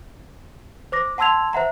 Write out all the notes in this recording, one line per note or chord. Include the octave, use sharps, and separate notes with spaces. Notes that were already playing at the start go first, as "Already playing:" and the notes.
C5 D6 A#6
F#5 A5 C6 E6 G#6 F7
C5 E5 F#5 A#5